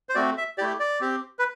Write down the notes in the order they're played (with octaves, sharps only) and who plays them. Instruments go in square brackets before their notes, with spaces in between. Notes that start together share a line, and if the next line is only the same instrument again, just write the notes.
[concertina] C5
A3 C4 F#4 D5
E5
A3 E4 G4 D5
D5
C4 G4
B4